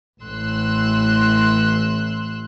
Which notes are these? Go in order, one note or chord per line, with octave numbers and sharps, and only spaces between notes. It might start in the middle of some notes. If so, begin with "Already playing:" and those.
A1 A2 C6 E6 F#6